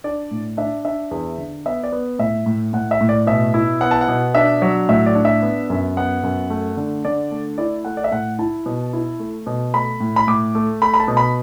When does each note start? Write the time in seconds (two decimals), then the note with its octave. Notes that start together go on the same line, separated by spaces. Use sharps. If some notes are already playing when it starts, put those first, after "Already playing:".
0.04 D4 D5
0.31 A2
0.57 D4 E5
0.85 D4 E5
1.11 E2
1.38 D3
1.66 B3 E5
1.84 D5
1.92 B3
2.19 A2 E5
2.46 A2
2.73 A2 F#5
2.91 E5
3.01 A2
3.09 D5
3.27 B2 E5
3.54 E4
3.81 B3 F#5
3.91 A5
4.01 F#5
4.08 B2
4.35 D4 E5
4.62 F#3
4.89 A2 E5
5.06 D5
5.15 D4
5.25 E5
5.42 B3
5.70 F#2
5.97 B3 F#5
6.23 F#2
6.50 A3
6.77 D3
7.05 D3 D5
7.31 A3
7.58 E4 D5
7.85 A3 F#5
7.97 D5
8.04 E5
8.12 A2 F#5
8.39 E4 A5
8.66 B2
8.93 E4
9.20 A3
9.47 B2
9.74 A3 B5
10.00 A2
10.16 B5
10.27 A2 D6
10.55 A3
10.82 A3 B5
10.94 B5
11.00 A5
11.08 B2
11.17 B5